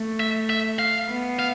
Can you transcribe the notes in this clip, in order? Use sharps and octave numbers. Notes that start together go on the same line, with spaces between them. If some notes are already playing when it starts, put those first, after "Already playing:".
Already playing: A3
E5
E5
F5
B3
F5